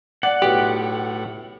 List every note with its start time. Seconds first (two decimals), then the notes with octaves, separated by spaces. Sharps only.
0.23 D5 F#5
0.42 B1 A2 G4